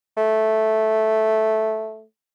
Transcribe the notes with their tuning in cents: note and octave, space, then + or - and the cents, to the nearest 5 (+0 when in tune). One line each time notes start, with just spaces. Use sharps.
A3 -5